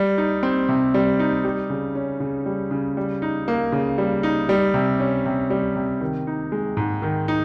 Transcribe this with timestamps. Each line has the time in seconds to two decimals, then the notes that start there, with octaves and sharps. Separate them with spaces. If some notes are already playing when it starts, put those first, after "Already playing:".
Already playing: G3
0.18 D#4
0.43 C4
0.69 C3
0.94 G3
1.19 D#4
1.45 G3
1.70 C#3
1.95 C#4
2.20 C#3
2.46 G3
2.71 C#3
2.97 G3
3.22 D#4
3.48 A#3
3.72 C#3
3.98 G3
4.23 D#4
4.49 G3
4.74 C3
5.00 C#4
5.26 C3
5.50 G3
5.76 C3
6.01 D#3
6.27 D#4
6.52 G#3
6.77 G#2
7.02 D#3
7.28 D#4